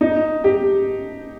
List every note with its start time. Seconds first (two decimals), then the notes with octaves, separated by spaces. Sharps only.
0.01 D#4
0.44 G4